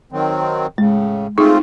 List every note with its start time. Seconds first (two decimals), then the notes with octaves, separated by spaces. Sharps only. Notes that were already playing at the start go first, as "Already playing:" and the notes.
0.12 D#3 F#3 C4
0.78 A2 C#3 G#3
1.38 A3 C4 D#4 F4 G#4